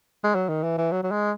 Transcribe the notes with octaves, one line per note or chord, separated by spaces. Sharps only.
G#3
F#3
D#3
E3
E3
F#3
F#3
G#3